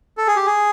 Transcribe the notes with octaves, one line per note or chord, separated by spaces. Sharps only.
A4
G#4
G4
G#4